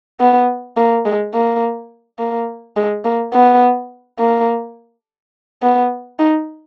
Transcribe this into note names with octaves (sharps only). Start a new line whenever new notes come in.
B3
A#3
G#3
A#3
A#3
G#3
A#3
B3
A#3
B3
D#4